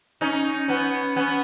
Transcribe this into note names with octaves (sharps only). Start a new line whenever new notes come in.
C#4 D#4
B3 C#4
B3 C#4